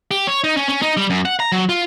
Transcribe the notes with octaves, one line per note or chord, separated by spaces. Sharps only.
G4
C#5
D#4
C#4
C#4
D#4
G3
F#2
F#5
A#5
F#3
F4